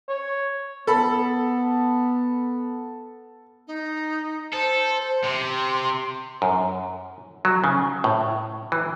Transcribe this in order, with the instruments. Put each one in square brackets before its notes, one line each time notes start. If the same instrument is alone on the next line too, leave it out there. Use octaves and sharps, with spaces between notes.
[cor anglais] C#5
[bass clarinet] B3 [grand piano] A4 B5
[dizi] D#4
[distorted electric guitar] A4 [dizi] C5
[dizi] C5
[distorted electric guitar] C3 [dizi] C6
[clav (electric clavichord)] F#2
F#3
C#3
A2
E3